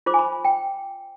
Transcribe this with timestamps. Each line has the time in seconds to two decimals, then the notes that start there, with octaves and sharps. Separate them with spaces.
0.06 F4 C5 D6
0.14 G#5
0.19 B5
0.45 G5